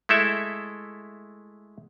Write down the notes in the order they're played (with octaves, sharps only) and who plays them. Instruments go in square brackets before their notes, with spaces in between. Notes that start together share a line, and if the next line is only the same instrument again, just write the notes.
[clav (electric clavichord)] G#3 A3 E4 A4 E5